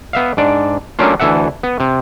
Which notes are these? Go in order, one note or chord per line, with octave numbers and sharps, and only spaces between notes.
B3 E5 F5
G#2 D4 D5
F#3 A3 A#3 C#4 D4 F4
D2 E3 A4 E5 F#5
B3
C3